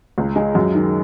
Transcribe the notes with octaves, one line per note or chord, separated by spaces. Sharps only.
C#2
G#3
F#2
D#3